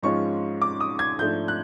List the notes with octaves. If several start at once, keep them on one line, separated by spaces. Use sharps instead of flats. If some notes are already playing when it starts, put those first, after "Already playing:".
G#2 F3 G#3 C#4 F4 C#6
D6
D#6
G#6
G#2 F3 A3 D4 G6
F#6